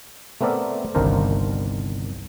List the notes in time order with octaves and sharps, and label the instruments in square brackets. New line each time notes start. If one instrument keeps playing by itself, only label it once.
[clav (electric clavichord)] A3 B3 C4 A#4 D5 E5
G1 C2 D#3 D4 A#4 C5